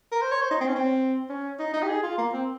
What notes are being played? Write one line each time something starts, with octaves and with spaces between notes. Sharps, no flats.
A#4
C5
C#5
C5
D#4
C4
C#4
C4
C#4
D#4
D#4
G4
G#4
F4
A#3
C4